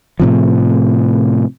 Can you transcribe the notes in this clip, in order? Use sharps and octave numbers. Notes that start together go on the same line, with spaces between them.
A2 C3 F3